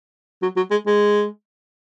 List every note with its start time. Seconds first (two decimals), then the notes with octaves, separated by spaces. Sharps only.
0.42 F#3
0.57 F#3
0.71 G#3
0.86 G#3